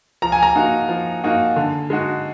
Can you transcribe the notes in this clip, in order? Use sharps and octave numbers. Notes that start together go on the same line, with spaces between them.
F3 A#5
G#5
A#5
A#3 D#4 F#4
F3
A#3 D#4 F#4
D3
G#3 D#4 F#4